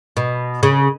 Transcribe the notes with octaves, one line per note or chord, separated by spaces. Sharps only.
B2
C#3